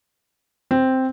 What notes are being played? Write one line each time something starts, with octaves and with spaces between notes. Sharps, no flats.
C4